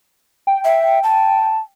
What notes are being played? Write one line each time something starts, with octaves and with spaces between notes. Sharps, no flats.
G5
E5
A5